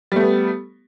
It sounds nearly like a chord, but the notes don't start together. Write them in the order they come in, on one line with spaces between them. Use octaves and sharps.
G3 A3 B3